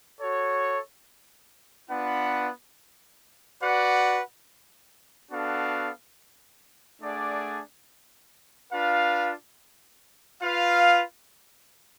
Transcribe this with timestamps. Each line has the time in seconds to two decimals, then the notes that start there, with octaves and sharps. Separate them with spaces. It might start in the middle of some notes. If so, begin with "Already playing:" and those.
0.20 F#4 A4 C#5
1.89 B3 D4 F4 B4 F#5
3.61 F#4 B4 D5 F#5
5.31 B3 D4 F#4 A4 F5
7.01 A3 D4 G#4 D5 F#5
8.72 D4 F4 B4 F5
10.42 F4 B4 F5